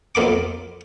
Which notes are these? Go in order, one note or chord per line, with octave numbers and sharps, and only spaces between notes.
F2 A#3 B5 D6